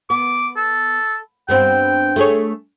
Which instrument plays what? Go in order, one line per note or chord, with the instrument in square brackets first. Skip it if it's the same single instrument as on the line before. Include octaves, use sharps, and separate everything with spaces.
[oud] B3 [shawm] D6
[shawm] A4
[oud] G2 B3 C4 [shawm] G5
[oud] A3 G#4 C#5